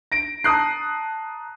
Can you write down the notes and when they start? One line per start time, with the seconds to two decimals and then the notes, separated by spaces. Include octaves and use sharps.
0.12 A#6 D7
0.44 A5 A#5 D#6 F#6 C7